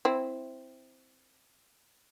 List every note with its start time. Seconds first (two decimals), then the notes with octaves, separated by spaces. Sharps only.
0.05 C4 E4